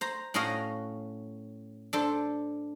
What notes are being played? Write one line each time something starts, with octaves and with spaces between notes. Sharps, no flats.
C5 A#5
A2 C#4 F#4 D#5 F5
D4 A4 C5